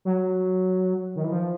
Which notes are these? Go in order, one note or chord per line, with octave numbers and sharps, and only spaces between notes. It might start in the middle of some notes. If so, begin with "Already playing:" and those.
F#3
D#3
E3
F3